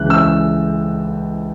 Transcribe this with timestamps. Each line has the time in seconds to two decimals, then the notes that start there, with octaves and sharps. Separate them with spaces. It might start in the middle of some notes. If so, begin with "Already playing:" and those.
Already playing: C#2 C#3 E3 F#6
0.10 E6